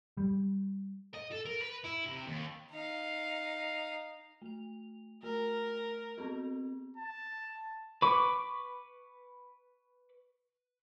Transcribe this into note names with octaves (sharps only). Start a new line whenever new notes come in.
G3
D#5
A4
A#4
B4
E4
C3
D#2
D#4 F5
A3 F7
A3 A#4
B3 C4 F#4
A5
B4 B5 C#6 D6